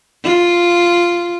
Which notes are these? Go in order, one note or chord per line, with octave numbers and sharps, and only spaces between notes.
F4